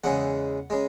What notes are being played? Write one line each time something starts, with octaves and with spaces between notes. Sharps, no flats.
E2 C#3 G#3 F#5
C#3 G#3